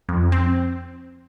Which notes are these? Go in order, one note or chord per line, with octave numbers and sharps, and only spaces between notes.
F2
C4